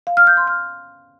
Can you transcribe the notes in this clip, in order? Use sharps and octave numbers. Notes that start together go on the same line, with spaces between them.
F5
F6
G6
C6
F6